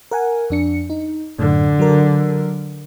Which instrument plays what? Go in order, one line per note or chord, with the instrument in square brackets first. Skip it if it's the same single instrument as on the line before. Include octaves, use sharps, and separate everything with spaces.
[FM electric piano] A#4 F#5 G#5
F2 D4 C#7
D#4
[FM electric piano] F#2 A2 [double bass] D3
[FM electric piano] F#3 A#4